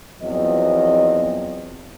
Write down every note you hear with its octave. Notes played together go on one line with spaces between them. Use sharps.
E2 F3 F#3 C4 D#5